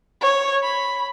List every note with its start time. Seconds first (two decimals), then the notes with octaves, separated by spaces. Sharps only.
0.21 C#5
0.63 B5